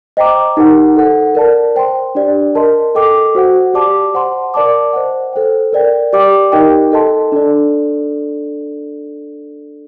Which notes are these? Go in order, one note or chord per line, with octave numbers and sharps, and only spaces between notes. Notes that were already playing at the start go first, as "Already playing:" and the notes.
C5 D#5 G5 A#5 D6
D#4 G4 A#4 F#5 A5
A4 C5 F#5
A#4 D5 A5
C5 G5 C6
D4 G4 D5
A#4 D#5 A5 C6
A4 D#5 G5 D6
F#4 C5 F#5
G4 D5 A5 D6
C5 F#5 A5 C6
A#4 D5 A5 D6
C5 D#5 F#5
A4 C5 G5
A#4 D5 G5
G4 D5 G5 D6
D#4 G4 A#4 D#5 G5
A4 D#5 A5 C6
D4 A4 D5